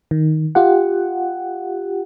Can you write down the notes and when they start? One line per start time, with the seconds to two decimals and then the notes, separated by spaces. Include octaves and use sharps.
0.11 D#3
0.55 F4 G4 F#5